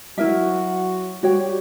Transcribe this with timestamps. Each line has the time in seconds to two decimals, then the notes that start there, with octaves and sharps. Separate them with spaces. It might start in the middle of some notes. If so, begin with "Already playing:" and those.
0.17 F#3 E4 F#4 A#4 E5
1.23 G3 F#4 G4 C#5 G5